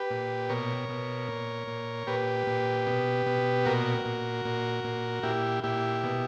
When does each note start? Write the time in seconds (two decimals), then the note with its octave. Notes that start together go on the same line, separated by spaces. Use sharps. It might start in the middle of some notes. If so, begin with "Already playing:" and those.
Already playing: G4 B4
0.11 A#2
0.49 B2 A#4 C#5
0.89 B2
1.29 A#2
1.68 A#2
2.07 A#2 G4 B4
2.47 A#2
2.87 B2
3.26 B2
3.65 A#2 F#4 A#4
4.05 A#2
4.45 A#2
4.84 A#2
5.23 A#2 E4 G4
5.63 A#2 E4 G4
6.03 B2